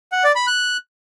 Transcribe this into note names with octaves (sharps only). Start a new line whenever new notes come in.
F#5
D5
B5
F#6